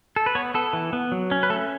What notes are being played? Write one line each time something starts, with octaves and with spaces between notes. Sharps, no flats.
A4
B4
B3 C#5
B3 A4
E3
B3
F#3
C#4
B4
A3 A4